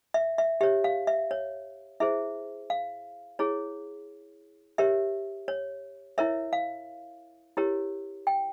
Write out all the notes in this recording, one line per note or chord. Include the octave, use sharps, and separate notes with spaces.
E5
E5
G4 C#5 E5
F5
E5
C#5
E4 G#4 C5 E5
F5
E4 G#4 C#5
G4 A#4 C#5 E5
C#5
E4 A#4 C#5 E5
F5
E4 G4 A#4 C#5
G5